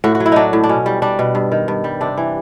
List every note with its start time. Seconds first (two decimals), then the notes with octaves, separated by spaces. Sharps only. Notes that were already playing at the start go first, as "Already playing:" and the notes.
0.04 A2 F#4
0.15 F#4
0.20 F#3
0.26 E4
0.32 F#3 D4 D#4
0.53 A2
0.64 D4
0.69 B2 C#4
0.86 G3
1.02 G3 D4
1.19 B2
1.35 G2
1.52 D#3
1.68 G2
1.84 G3
2.01 C3 D4
2.18 E3